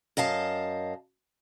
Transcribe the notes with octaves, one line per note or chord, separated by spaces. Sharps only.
F#2 D#5 F5 A5